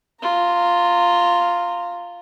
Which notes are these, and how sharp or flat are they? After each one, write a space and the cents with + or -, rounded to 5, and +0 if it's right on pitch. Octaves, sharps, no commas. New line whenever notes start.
F4 +0 A#5 -25